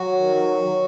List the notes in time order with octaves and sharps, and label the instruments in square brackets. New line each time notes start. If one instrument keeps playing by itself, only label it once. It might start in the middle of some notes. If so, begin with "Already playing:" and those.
Already playing: [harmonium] F#3 [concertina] F#4
[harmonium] D#3
F#3
F#3